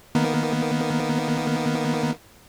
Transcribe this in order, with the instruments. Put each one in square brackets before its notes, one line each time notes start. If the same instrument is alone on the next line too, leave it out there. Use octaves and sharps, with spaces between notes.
[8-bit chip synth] D#3 A#3 B3